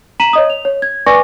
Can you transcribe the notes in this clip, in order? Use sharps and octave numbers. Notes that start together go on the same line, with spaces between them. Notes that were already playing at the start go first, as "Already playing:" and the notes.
A#5 B6 D#7 E7 F#7
C#5 D#5 D#6
F7
C#5
G#6
B4 D5 G#5 C#6 D6 A#6